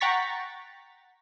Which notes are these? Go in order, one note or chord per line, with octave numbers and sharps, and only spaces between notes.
F#5 G5 A#5 C#6 A6 B6